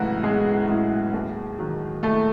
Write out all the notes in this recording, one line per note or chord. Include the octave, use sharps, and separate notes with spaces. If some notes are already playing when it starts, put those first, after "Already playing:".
Already playing: B1 A2 C#3 E3 F#3 G#3 E4 F#4
B1 G#3 G#4
A2 G#3
D#2
D#3 F#3
D#2 A3 A4